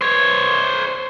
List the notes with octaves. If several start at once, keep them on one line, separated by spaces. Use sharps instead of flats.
C5 C#5